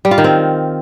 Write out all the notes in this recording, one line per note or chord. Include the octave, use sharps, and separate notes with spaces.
G3
F4
D#3
C4